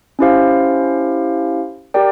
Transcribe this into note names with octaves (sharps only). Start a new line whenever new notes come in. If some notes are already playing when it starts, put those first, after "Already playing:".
C#4 E4 G4 C5 F5
G4 A#4 D5 G5